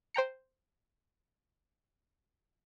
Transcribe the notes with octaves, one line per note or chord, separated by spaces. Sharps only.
C5 G5 A#5 C#7